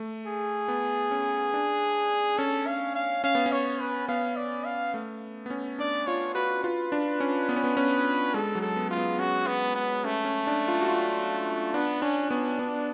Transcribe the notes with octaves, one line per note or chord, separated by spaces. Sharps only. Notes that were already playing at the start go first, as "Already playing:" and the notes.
Already playing: A3
G#4
B3
C#4
D4
C#4 A4
F5
F5
C#4 F5
B3
C#4
C#5
B4
B3 F5
D5
F5
A3
B3
C#4
D4 D5
F4 C#5
F#4 B4
F4 B4
D4
C#4
B3
C#4
B3
C#4
G#3 A4
F#3
A4
B3
F4
B3
C#4 F#4
B3
B3
A3 C#4
C#4
D4
F4
F#4
F4
B3 D4
C#4 D4
B3 C#4
B3 D4